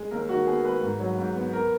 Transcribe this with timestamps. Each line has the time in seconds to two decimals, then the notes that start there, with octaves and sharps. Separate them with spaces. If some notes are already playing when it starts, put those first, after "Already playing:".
Already playing: G#3
0.11 D#2 A#4
0.29 D#3 F#4
0.47 B3 G#4
0.64 G#3 B4
0.82 G#2
1.00 F#3
1.18 G#2
1.36 B3
1.53 A#4